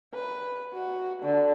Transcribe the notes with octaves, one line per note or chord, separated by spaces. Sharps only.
B4
F#4
D3